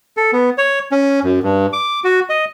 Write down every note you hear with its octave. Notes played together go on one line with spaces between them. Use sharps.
A4
B3
C#5
C#4
F#2
G2
D6
F#4
D#5